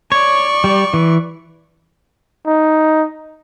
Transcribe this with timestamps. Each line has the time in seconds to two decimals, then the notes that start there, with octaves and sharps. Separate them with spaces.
0.12 C#5 D5 C#6
0.64 G3
0.94 E3
2.46 D#4